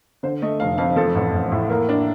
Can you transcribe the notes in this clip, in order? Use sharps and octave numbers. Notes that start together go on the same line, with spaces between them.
D3 C5
A3 D#5
F1 F5
F2 F5
F3 A4
A1
A1
A2
A#3 A#4
D4